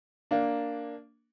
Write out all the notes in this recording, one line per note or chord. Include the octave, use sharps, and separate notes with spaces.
A#3 D4